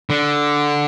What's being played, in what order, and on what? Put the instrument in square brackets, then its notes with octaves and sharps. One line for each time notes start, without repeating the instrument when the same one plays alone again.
[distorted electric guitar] D3